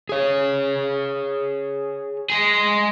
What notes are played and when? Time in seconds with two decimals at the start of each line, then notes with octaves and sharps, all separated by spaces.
0.09 G#4 C#5
2.30 G#3 G#4